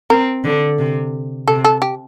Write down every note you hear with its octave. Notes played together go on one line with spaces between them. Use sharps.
C4 A#4
D3
C3
C3 A4
A4
G4